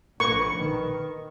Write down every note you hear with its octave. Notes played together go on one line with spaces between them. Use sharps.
A#1 A#4 B4 C#6
D#3